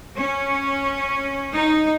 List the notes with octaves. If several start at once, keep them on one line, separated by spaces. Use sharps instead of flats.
C#4
D#4